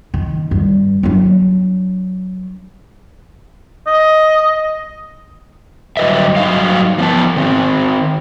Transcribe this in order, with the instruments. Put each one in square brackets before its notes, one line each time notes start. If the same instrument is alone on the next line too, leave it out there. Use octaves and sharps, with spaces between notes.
[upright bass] D#3
G2
F#3 D4
[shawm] D#5
[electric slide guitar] G2 D3 F#3 B4 D#5 E5
G2 F#3 G3 D#4 F5
F3 B3 A5
D#3 C4